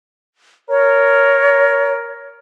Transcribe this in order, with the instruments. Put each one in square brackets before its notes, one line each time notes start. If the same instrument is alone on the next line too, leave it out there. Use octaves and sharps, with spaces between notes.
[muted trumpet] A#4 [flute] C#5